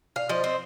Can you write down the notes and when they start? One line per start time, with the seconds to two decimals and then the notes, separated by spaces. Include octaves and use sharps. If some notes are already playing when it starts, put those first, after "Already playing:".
0.16 F5
0.29 F3 D#5
0.44 C4